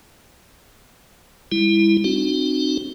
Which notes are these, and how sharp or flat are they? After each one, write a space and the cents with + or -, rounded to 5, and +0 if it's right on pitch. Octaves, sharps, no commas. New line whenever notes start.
G3 +45 E4 +0
C4 +0 D#4 -40 F#4 +0